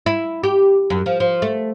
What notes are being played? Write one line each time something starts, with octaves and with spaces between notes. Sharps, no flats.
E4
G4
F#2
F3
F3
A3